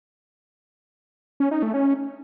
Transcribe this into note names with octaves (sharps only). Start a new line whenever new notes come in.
C#4
D#4
A3
C#4